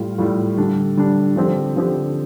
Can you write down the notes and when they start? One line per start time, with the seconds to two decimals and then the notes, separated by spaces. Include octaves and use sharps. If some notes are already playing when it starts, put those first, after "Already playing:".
Already playing: A2 G3 F4
0.18 A2 G3 F4
0.57 D3 G3 D4
0.97 D3 G3 D4
1.36 D3 F3 C4 G4
1.76 D3 F3 C4 G4